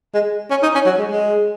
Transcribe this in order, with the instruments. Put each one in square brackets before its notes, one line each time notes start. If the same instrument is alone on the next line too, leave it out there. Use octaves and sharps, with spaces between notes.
[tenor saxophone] G#3
C#4
D#4
C#4
F#3
G#3
G#3